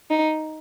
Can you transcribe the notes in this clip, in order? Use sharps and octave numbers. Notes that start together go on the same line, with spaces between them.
D#4